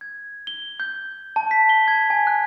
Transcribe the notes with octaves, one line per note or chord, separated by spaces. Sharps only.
G#6
G7
G6
A5
B6
G7
G#6
G#5
F#6